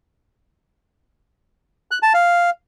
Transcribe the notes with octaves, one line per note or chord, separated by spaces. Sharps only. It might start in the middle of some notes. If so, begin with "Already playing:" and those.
F#6
A5
F5